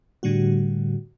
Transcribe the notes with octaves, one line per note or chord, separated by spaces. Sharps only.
A2 D3 G3 F#4